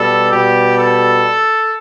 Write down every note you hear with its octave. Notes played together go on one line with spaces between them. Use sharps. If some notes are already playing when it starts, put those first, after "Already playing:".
Already playing: B2 G3 A4
B2 G3 G4
A4